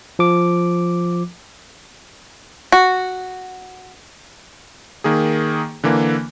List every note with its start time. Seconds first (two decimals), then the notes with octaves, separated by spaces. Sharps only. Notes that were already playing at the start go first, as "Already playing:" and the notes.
0.19 F3 D6
2.72 F#4
5.04 D#3 A#3 G#4
5.84 D3 E3 A#3